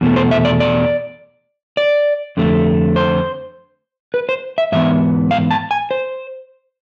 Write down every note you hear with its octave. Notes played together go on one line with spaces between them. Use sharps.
E2 B2 A3
C5
E5
D5
D5
D5
F2 D3 A3
C5
B4
C5
E5
G#2 E3 B3 E5
F5
A5
G#5
C5